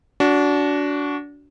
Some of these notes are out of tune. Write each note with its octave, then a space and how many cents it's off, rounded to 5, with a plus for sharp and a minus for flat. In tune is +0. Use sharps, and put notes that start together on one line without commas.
D4 -25 F#4 +0